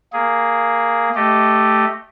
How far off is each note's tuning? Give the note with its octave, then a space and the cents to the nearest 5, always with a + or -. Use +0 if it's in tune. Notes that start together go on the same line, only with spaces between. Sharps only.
A#3 +0 G#4 +0
A3 +0 G4 +0 D#5 -10